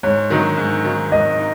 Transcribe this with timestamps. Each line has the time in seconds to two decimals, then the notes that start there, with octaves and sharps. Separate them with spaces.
0.03 G#2 C#5
0.30 D#3 F#3 D#4
0.57 G#2
0.85 D#3 F#3 D#4
1.12 G#2 D#5
1.39 D#4